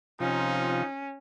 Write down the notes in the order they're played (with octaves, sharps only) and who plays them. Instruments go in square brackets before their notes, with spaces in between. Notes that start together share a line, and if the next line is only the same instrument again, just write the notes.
[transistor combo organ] C3 F3 [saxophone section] D#3 C4 F4 [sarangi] C#4 [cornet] D#4